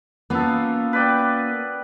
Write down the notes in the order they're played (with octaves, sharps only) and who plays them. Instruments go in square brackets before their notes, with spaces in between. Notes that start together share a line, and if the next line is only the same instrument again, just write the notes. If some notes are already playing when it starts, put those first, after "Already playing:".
[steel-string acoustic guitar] A#3 C#4 F4 [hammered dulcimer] B3 A4
[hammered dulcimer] B4 D5 G5